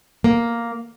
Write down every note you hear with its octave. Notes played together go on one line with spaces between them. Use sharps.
A#3